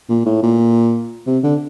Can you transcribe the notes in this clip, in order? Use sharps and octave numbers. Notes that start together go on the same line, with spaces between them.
A#2
A2
A#2
C3
D3